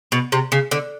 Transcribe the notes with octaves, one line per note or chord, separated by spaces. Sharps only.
B2
C3
C#3
D3